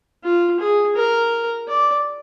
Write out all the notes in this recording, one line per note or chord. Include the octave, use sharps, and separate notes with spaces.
F4
G#4
A#4
D5